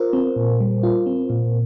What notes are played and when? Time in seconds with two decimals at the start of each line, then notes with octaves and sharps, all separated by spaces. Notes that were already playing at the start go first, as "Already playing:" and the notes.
Already playing: F4 A#4 C5
0.13 C4
0.36 A#2
0.60 G3
0.83 F4
1.06 C4
1.30 A#2